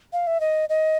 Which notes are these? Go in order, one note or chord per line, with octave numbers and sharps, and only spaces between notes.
F5
E5
D#5
D#5